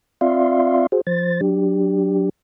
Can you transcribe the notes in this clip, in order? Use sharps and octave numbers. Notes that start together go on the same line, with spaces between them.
C4 F4 D5 E5 F5 C6
F#4 G#4 C5
F3 C5 A6
F#3 D4 G4